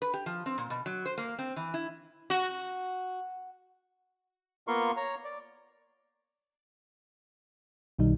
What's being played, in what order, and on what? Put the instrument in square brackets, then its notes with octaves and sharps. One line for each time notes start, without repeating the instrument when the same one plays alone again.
[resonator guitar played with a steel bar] B4
G4
F3
C4
A#2
B2
F#3
C5
A#3
C4
E3
E4
[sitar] F#4
[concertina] A#3 B3 F4 A#4 C6 C#6
C#5 A#5
D5
[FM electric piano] B1 D#3 D#4 [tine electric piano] B2 G3